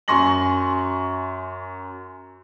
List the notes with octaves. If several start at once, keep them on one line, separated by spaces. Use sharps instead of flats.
F#2 G#5 C6 C#6 A#6 F#7